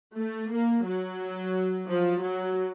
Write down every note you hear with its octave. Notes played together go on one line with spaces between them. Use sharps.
A3
A#3
F#3
F3
F#3